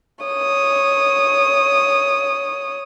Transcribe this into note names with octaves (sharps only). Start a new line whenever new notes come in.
C#5 D#6